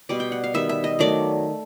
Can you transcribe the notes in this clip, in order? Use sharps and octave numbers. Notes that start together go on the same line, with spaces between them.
B2 G3 B3 D5
G5
F#5
F5
D#3 G3 B3 E5
E5
D#5
D#3 F#3 A3 D5